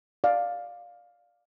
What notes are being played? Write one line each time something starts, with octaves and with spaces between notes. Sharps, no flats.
D5 F5